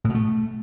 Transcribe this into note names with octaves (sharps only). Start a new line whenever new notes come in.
A2
B2
A3